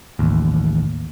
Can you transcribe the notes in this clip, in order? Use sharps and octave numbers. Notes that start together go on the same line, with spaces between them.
A1 D#2